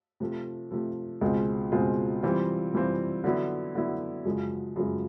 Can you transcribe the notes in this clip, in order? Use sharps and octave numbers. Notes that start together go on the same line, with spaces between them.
C3 F3 A3
C3 F3 A3
C#2 B2 G#3 C4 F4
C#2 B2 G#3 C4 F4
C3 E3 G3 C4 F4
C3 E3 G3 C4 F4
D3 F#3 B3 E4
D3 F#3 B3 E4
F#2 C#3 F3 G#3
F#2 C#3 F3 G#3